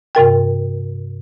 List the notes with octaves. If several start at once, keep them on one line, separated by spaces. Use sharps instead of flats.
G2 C3 A#4 G5